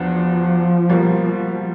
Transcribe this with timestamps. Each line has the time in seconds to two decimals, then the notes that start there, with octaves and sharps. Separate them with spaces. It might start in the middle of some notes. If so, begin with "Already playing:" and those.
Already playing: E2 F3 F#3 B3 D4
0.89 B2 G3 A#3